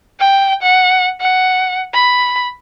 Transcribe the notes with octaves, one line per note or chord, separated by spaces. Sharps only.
G5
F#5
F#5
B5